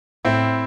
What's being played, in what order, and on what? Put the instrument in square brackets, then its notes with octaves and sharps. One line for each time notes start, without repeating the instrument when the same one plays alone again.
[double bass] A2 [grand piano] C4 E4